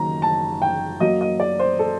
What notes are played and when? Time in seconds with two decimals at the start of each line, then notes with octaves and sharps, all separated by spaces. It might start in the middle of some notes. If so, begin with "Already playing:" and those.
Already playing: F#1 F#2 D#3 A#5
0.22 A5
0.62 G5
1.00 F#2 F#3 A#3 D#5
1.21 D#5
1.40 D5
1.60 C5
1.79 A4